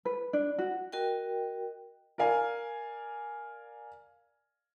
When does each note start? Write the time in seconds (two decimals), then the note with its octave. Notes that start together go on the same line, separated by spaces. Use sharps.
0.05 B4
0.33 D4
0.58 F#4
0.92 F#4 A#4 D#5 G5
2.18 A#4 D5 F5 G#5